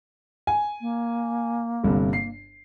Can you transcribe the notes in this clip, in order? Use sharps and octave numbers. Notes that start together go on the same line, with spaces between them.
G#5
A#3
G1 G2 C3
C7